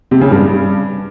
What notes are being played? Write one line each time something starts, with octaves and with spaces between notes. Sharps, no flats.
C3
C#3
G2